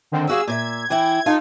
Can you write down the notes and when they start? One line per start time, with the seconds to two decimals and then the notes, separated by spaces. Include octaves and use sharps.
0.12 D3 D#3 C4
0.27 G3 F#4 G#4 F5 E6
0.48 A#2 C5 E5 G#6
0.90 E3 E4 G5 G#6
1.26 D#4 F4 A4 F5